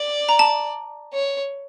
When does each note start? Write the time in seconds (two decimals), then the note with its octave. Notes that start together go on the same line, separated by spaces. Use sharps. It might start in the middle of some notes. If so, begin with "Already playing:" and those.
Already playing: D5
0.29 A#5
0.39 A5
1.13 C#5